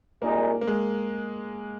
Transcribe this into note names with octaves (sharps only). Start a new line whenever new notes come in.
C2 A#2 G#3 A#3 D#4
A#3
G#3